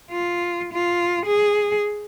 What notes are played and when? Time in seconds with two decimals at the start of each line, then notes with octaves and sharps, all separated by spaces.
0.11 F4
0.73 F4
1.25 G#4